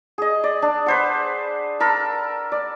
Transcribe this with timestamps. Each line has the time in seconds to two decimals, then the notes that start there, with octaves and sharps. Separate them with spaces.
0.18 G#4 D#5
0.44 D5
0.62 D4
0.86 B4 C5 F#5
1.80 A4 A#4 B5
2.52 D5